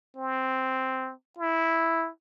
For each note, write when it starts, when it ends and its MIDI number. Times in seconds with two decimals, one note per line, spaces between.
0.17 1.13 60
1.38 2.09 64